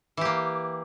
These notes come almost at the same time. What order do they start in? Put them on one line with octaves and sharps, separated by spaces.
E3 G4 A#3